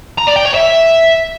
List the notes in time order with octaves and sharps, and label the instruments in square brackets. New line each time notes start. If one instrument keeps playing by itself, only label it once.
[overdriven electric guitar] A#5
D5
G5
C#5
E5